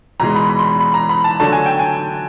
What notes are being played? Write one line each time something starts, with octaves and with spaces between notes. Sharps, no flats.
E2 B2 G#3 A#5
B5
B5
C6
B5
B5
A#5
B5
A5
D3 F#3 A3 D4 A5
G#5
G5
G#5